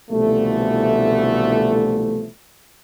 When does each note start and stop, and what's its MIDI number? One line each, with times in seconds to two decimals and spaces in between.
0.11 2.28 36
0.11 2.28 47
0.11 2.28 50
0.11 2.28 52
0.11 2.28 53
0.11 2.28 57